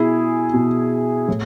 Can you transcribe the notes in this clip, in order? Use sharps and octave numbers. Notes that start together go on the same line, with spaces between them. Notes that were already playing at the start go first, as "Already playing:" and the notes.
Already playing: B2 E4 G#4
B2
A2